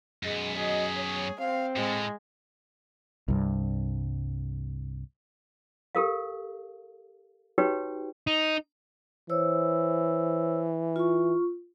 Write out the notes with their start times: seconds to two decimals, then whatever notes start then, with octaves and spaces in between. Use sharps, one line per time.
0.23 F#2 G#3 B3
0.56 F#3 G#4 D#5
0.97 C#5
1.40 C4 F5
1.76 A2 G#3
3.28 C2 G2
5.95 G4 A4 A#4 F5
7.58 D#4 F#4 G4 B4 C#5 G5
8.27 D#4
9.30 E3 C5 C#5 E6
10.96 F4 C#6